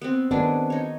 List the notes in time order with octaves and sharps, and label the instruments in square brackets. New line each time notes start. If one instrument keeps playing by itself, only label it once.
[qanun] B3 C4
[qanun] D#3 D4 G#4 [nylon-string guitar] B3 C4 F#4
[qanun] D#4 C#5